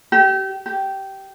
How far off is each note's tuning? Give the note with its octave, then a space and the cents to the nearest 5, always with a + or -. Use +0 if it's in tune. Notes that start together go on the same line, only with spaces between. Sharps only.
G4 -30
G4 -15